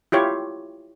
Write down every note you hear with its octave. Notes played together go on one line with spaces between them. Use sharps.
E4 F4 G4 C#5